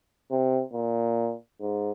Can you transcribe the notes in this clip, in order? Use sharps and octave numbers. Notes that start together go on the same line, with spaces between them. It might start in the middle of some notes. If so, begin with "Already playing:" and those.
C3
A#2
G#2